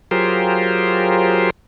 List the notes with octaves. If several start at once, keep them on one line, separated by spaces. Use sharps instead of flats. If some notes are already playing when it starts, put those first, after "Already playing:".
F#3 F4 G4 G#4 A#4 C5